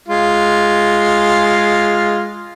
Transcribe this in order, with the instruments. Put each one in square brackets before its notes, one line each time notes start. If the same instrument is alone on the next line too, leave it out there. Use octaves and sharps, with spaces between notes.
[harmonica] G#3 F4